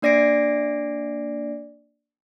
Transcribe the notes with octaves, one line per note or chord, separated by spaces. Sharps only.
A#3 D4 D5 A#6 C7 D7